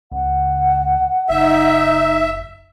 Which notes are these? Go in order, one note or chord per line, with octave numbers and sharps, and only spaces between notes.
C#2 F#5
F#1 D#4 E5